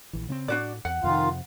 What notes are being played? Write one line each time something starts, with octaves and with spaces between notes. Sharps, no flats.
A#1 E3
C#3 B3 C4
A2 D4 F#4 D5
E2 F#5
F2 C3 D#3 F4 F5